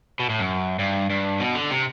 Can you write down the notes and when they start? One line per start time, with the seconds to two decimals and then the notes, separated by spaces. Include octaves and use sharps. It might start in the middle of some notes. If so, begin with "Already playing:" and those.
0.19 B2
0.29 A2
0.39 F#2
0.79 G2
1.10 G2
1.40 B2
1.55 D3
1.71 C3